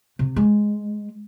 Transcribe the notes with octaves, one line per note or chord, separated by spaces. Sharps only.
C3
G#3